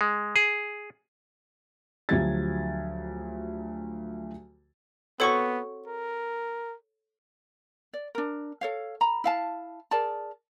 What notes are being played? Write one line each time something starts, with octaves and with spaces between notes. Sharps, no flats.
G#3
G#4
D2 F3 F#3 G4 G#6 A6
B3 C4 F#4 A4 C#5 C#6 C#7
A#4
D5
D4 A#4
A4 C#5 F5
A#5 B5
E4 F5 A5
G#4 A#4 D5 A5